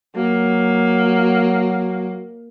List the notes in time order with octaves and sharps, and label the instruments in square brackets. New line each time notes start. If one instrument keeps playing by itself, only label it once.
[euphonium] F#3 [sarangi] A#3